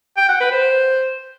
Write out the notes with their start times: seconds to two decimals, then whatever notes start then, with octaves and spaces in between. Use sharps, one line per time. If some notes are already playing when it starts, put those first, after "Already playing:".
0.17 G5
0.29 F#5
0.40 B4
0.52 C5